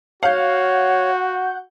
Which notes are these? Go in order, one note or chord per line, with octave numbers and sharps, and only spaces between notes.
F#4 C#5 F5 F#5 G6